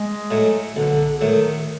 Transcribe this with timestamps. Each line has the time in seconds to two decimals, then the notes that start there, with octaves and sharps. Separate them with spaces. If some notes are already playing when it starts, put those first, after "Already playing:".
Already playing: G#3
0.31 A2 F#3
0.76 B1 D3
1.21 A2 D#3 F#3